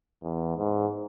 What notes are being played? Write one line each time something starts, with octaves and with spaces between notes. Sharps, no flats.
E2
G#2